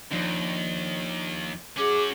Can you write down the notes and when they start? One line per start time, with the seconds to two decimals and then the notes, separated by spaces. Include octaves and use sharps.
0.11 D#2 F3 D4 D#4
1.77 C#4 F#4 G#4 D6